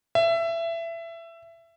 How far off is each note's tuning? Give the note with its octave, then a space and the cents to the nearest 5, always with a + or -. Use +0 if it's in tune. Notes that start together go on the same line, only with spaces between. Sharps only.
E5 +20